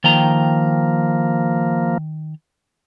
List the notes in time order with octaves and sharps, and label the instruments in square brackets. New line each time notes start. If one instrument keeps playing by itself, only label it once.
[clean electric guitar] D#3 G5 A#5 [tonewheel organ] F3 A#3